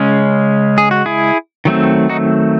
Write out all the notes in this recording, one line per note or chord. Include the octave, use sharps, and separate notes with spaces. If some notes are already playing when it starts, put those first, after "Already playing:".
Already playing: C#3 G#3 C#4
G#4
F#4
E4 G#4
D#3 F#3 A3 C4
D#4 F#4